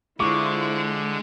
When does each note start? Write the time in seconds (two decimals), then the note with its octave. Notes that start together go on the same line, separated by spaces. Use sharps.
0.20 D3 G#3 E4 F4 C5 C#6 D6